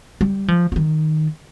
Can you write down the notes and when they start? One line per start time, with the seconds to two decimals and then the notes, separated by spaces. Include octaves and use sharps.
0.21 G3
0.48 F3
0.72 F3
0.76 D#3